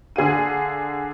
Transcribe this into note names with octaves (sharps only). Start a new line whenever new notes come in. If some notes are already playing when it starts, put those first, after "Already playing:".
D3 G#4 F5 D#7